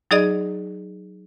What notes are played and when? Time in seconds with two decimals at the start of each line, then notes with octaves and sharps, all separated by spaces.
0.11 F#3 D#4 G#4 D5 D#5